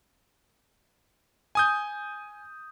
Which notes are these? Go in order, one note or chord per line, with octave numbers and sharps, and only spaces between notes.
G#5 D#6 G6